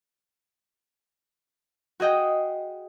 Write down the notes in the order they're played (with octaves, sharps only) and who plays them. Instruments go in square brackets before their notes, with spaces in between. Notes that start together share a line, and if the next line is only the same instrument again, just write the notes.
[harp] F#4 G#4 D#5 G5